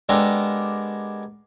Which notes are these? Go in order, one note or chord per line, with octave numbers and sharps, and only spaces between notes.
G#3 B3 D4 G4 A4 A#4